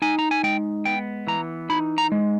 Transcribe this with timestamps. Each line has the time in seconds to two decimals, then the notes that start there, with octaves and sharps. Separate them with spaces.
0.02 D#4 G#5
0.19 A#5
0.31 G#5
0.43 G#3 G5
0.85 B3 G5
1.27 E3 A#5
1.70 D#4 B5
1.98 A#5
2.12 G#3